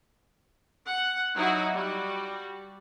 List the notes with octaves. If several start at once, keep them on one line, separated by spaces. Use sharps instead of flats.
F#5
F#3 D#4 E4 F#4
G3 F#4